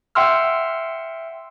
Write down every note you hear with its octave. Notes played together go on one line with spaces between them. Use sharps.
E5 F#5 G5 C6 E6 F6